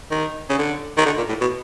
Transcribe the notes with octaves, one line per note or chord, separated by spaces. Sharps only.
D#3
C#3
D3
D#3
D3
A#2
A2
B2